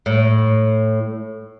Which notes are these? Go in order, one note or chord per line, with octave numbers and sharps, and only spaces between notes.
A2